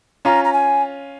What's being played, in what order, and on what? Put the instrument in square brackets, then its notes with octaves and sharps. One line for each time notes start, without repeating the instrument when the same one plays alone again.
[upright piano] C#4 F4 [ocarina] A#5
[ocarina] A#5
G#5